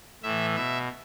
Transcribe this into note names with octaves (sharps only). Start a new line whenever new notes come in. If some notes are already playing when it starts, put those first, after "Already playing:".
A2 E3 E5
B2 E5